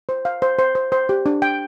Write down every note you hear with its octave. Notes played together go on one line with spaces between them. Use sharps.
C5
F5
C5
C5
C5
C5
G4
D4
G5